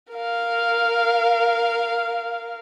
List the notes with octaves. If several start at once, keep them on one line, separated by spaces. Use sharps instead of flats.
A#4 F5